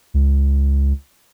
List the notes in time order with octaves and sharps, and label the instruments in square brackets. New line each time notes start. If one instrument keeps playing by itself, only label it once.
[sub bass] C#2